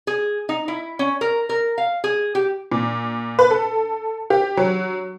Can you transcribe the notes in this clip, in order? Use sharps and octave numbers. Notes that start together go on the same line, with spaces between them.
G#4
D#4
E4
C#4
A#4
A#4
F5
G#4
G4
A#2
B4
A4
G4
F#3